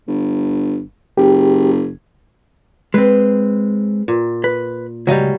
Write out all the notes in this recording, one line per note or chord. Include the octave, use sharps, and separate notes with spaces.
G1
F#1 G4
G#3 C4 B4
A#2
B4
C#2 F#3 G3 D#5 F5